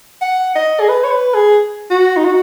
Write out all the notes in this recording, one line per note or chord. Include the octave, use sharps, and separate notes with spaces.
F#5
D#5
G#4
B4
C#5
B4
G#4
F#4
D#4
F#4